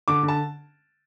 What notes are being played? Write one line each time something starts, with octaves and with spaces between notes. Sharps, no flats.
D3 D6
D3
A5